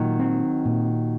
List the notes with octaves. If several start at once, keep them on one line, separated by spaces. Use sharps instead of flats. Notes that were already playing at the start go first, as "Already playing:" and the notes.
Already playing: A#2 D#3 F#3
C4
A#2